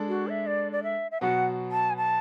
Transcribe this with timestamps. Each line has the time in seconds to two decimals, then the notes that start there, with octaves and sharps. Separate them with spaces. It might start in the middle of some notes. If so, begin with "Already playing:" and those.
Already playing: G#3 D4 A4
0.09 F#4
0.28 E5
0.47 D5
0.72 D5
0.83 E5
1.11 E5
1.21 B2 F#3 B3 F#4 F#5
1.72 A5
1.90 G#5
1.97 A5